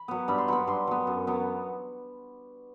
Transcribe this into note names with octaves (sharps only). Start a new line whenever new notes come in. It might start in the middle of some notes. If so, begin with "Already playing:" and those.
Already playing: B5
F#3 B3
G2 B5
C6
F#3 B3 B5
G2 C6
F#3 B3
F#2
F#3 B3